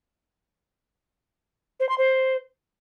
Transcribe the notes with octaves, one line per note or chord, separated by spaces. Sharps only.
C5
C6
C5